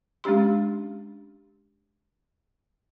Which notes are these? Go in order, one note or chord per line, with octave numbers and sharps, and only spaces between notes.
G#3 C#4 D4 G4 C6